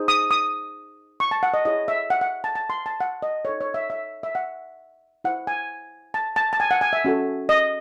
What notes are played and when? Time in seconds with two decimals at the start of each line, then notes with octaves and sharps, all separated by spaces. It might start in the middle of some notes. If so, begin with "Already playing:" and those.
Already playing: D#4 G#4 C5
0.08 D#6
0.31 D#6
1.20 C#6
1.31 A5
1.43 F#5
1.54 D#5
1.65 E4 G#4 C#5 D#5
1.88 E5
2.10 F#5
2.21 F#5
2.44 A5
2.55 A5
2.70 C6
2.86 A5
3.01 F#5
3.22 D#5
3.45 D#4 A4 C#5
3.61 C#5
3.74 E5
3.90 E5
4.23 E5
4.35 F#5
5.24 E4 C5 F#5
5.47 G#5
6.14 A5
6.36 A5
6.53 A5
6.60 G#5
6.71 F#5
6.81 G#5
6.93 E5
7.05 C#4 F#4 A4
7.49 D#5